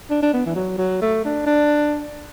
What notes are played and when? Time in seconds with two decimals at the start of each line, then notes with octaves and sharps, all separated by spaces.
0.10 D4
0.22 D4
0.33 B3
0.45 E3
0.55 F#3
0.78 F#3
1.02 A3
1.25 D4
1.46 D4